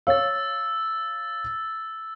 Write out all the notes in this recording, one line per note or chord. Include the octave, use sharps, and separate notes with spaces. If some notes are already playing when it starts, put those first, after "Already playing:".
C#5 F5 E6 A6